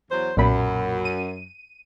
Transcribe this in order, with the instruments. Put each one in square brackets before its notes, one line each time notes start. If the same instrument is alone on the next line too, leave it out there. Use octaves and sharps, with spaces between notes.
[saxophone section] E2 F#3 C5
[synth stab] B1 A#2 B5 [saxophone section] F#2
[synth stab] D#7